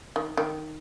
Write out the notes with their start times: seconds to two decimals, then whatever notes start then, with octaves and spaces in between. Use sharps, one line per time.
0.16 D#3
0.37 D#3